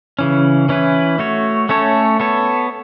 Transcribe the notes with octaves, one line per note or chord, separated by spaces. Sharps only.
C#3 E3 C#4
E3 C#4 E4 B4
A3 F#4 C#5
A3 C#4 A4 C#5
B3 A4 C#5